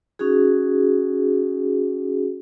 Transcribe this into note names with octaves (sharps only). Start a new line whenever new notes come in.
C#4 D#4 F#4 G#4